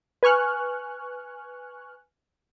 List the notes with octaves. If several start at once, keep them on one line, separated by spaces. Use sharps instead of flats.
B4 G#5 C#6 F6 F#6